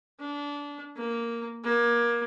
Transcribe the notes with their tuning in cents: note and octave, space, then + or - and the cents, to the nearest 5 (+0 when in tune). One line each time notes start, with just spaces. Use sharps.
D4 -25
A#3 -5
A#3 +25